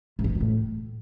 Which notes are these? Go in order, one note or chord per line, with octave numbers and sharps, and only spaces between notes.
G#2
E3
F#2
F2
A2